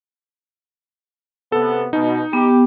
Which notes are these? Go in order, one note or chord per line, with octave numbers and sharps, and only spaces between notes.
C3 B3 A4
B2 D#4
B3 G4